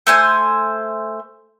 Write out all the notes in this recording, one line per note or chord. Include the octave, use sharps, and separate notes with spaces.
A3 C5 G#5